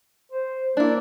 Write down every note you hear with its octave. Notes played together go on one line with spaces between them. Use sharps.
C5
A#3 D4 E4